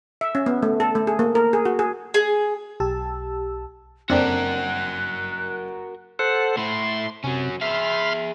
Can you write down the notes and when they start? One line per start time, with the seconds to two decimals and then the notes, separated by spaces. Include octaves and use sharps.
0.21 E5
0.35 C#4
0.46 B3
0.63 A3
0.80 A4
0.95 A3
1.07 G#4
1.19 A#3
1.35 A#4
1.53 G#4
1.65 F#4
1.79 G#4
2.14 G#4
2.80 B1 G4 A5 E6
4.10 F#1 C4 D4 F#4 A#4 G5 F#6
6.19 A4 C5 F#5
6.57 A3 E4 C6
7.24 C3 F#3 C#4
7.61 G#4 E5 B5 C6 F6